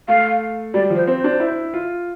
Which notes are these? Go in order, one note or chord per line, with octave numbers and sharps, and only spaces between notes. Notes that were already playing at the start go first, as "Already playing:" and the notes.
A3 F5
G3 D5
F3
C5
C4
C5
D4
E4
F4